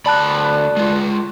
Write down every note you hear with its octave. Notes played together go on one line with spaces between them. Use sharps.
D2 D5 A5 B5 F#6
G#3 F4